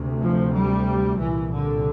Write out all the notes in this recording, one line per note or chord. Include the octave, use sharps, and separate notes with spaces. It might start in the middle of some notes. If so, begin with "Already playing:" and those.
Already playing: D2 C3
F3
G3
C2 A#2 E3
D3